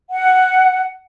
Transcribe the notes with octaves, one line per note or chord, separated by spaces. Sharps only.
F#5